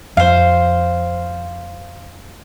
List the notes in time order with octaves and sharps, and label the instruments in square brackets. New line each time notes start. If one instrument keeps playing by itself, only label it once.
[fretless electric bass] F2 [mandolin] C5 F5